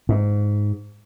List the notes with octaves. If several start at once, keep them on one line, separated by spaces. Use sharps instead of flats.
G#2